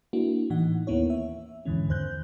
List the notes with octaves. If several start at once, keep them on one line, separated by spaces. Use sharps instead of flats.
A#3 D4 E4 F#4
A2 E3 D#4 F#5
D#2 A#3 B3 E4 C#5
E5
E2 G#2 D3 E3 C#4
E2 D#3 C5 F#6 G6